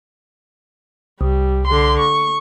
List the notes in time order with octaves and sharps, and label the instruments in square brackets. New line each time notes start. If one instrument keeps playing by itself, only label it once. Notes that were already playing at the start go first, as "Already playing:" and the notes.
[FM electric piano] C2 [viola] G3
[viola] D3 C6
C#6